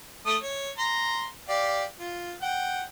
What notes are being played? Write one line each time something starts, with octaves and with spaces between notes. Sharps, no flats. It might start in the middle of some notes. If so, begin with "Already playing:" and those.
A3 A4 D#6
C#5
A#5 C6
G4 D5 F5
F4
F#5 G5